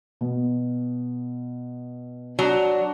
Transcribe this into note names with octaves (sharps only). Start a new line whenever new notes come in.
B2
F#3 D4